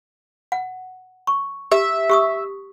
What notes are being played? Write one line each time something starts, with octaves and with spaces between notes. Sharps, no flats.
F#5
C#6
G4 E5
G4 C#6 D#6